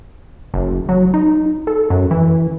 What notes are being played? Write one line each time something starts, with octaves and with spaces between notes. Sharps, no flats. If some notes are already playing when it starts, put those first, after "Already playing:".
F#1
F#3
D#4
A4
F#2
E3